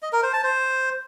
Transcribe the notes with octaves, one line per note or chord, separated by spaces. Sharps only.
D#5
A#4
C5
A5
C5